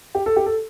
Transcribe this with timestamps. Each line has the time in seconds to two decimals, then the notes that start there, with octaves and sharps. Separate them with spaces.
0.15 G4
0.26 A4
0.36 G4
0.46 A4